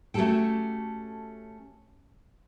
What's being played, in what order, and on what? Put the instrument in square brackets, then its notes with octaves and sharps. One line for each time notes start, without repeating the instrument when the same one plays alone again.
[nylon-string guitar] A3 C#4 F#4 G4 A4 G5